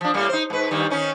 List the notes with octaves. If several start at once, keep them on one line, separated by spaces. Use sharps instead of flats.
F3 D4
A2 G3 A#3
D#4 C5
G#2 B4
G2 D#3 G3
D#3 C#4 D#4